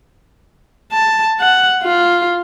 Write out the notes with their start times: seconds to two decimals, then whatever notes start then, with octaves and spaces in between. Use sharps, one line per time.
0.92 A5
1.40 F#5
1.82 F4